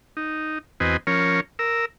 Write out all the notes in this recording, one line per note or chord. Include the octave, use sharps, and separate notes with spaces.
D#4
E2 C4 F#4 B4 D#5 G#5
F3 C#4 A#4 C#5
A#4 E6